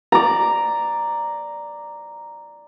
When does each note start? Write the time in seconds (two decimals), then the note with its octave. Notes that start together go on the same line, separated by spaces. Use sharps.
0.12 D5 A#5